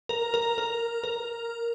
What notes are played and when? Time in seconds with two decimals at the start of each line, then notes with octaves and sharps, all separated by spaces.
0.09 A#4
0.34 A#4
0.58 A#4
1.04 A#4